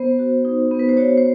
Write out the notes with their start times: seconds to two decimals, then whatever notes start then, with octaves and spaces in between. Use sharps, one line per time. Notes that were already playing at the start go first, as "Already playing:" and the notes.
Already playing: B3 C5
0.19 F#4
0.45 D#4
0.71 B3
0.79 B4
0.89 C5
0.97 F#4 C#5
1.17 C5